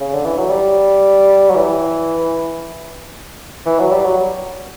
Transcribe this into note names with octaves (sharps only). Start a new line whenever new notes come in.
C#3
D3
E3
F#3
G3
F#3
E3
E3
F#3
G3
F#3